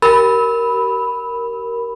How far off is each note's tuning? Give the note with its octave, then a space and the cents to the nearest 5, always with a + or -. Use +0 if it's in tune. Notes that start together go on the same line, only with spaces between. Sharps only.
G4 -30 A#4 +0 B5 +0